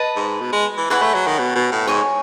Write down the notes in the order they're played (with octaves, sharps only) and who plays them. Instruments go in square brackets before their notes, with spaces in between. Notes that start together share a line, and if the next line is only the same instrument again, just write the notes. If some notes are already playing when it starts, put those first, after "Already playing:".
Already playing: [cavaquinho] B4 D#5 A5
[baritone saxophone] G#2
B2
G#3
E3
[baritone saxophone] E3 [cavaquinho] G#4 C#5 F#5 B5
[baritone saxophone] A3
F#3
D#3
B2
B2
A2
[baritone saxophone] G#2 [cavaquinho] C#5 G#5 C#6